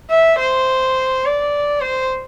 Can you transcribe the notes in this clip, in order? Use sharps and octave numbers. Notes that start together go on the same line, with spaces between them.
E5
C5
D5
C5